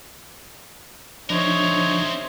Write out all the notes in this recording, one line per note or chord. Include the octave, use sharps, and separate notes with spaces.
F3 C4 D4 D#4 A#4 C5 C#5 E5